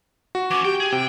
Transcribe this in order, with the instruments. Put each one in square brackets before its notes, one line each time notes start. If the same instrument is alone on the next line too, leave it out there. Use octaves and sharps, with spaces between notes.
[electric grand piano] F#4
[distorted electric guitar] E3 C#4 [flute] D6
[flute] G4 [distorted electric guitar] G5
[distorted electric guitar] G#4
[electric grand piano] C3 [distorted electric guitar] G5